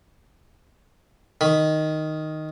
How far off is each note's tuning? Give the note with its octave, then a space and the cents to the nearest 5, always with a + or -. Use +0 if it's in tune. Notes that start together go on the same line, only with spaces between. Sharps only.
D#3 +0 B5 +0